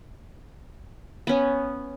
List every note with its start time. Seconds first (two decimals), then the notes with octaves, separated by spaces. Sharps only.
1.27 B3 C#4